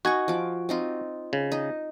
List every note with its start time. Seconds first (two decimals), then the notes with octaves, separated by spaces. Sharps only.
0.05 D#4 F#4 G#5 C#6
0.28 F3 D6
0.69 C4 D#4 F4
1.33 C#3
1.52 D#4